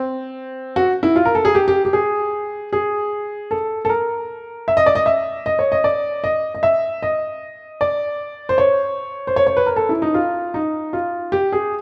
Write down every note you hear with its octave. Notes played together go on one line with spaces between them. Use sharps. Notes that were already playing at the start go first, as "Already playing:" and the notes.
Already playing: C4
F#4
E4
F4
A#4
A4
G#4
G4
G4
G4
G#4
G#4
A4
A4
A#4
E5
D#5
D5
D#5
E5
D#5
C#5
D#5
D5
D#5
D#5
E5
D#5
D5
C5
C#5
C5
C#5
C#5
B4
A#4
A4
E4
D#4
F4
D#4
F4
G4
G#4